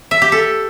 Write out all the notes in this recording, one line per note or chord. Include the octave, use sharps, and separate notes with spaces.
E5
G4
A4